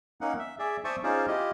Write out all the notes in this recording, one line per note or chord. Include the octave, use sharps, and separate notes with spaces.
A#3 C#4 D#4 F#5
E5
G#4 D5 E5
C5 D5 E5 A5 C#6 D#6
C#4 D#4 F4 G#4 C5 D5
E4 F4 G4 D#5